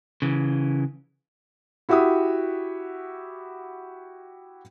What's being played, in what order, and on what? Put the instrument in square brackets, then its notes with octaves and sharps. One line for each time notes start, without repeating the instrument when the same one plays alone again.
[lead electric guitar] C#3 E3
[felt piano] E4 F#4 G4 E5 F#5 D#6